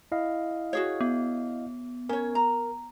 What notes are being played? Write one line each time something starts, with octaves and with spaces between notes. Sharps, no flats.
E4 D#5 F5
F#4 G#4 C#5
B3
C#4 A#4 C#5
A#5